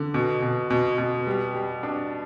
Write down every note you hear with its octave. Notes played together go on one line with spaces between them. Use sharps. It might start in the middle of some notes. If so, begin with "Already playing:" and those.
Already playing: D3
B2
B2
B2
B2
G3
G3
D4